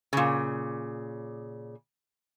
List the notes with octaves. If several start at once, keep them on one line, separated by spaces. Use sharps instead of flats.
A#2 C#3